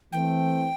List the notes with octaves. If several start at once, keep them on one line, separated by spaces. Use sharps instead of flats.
E3 A3 C4 G5